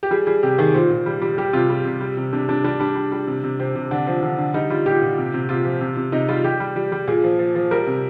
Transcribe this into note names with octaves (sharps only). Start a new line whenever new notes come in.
G4
G3 G#4
G3 G#4
C3 G4
D#3 G#4
A#2 C5
A#2
G3
G3
G3 G4
C3 F4
G3
C3
G3
C3
C3 D4
C3 D4
G3 D4
G3 D4
G3
G3
C3
C3
C3 C4
C3
D3 D4
F3
D3
D3
G3 D#4
G3 F4
A#2 G4
A#2
C3
C3
C3 F4
F3
C3
C3
C3 D#4
G3 F4
G3 G4
G3
G3
G3
A#2 G#4
F3
F3
F3
G3 A#4
C3